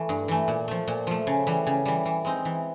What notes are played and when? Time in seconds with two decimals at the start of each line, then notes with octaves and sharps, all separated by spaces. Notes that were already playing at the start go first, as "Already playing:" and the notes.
Already playing: E3 A3
0.09 G2
0.28 E3 A3
0.48 A#2
0.68 F3 A3
0.88 A#2
1.07 F3 A3
1.27 C#3
1.47 E3 G3
1.67 C#3
1.85 E3 G3
2.05 E3
2.25 G#3 C4 D#4
2.45 E3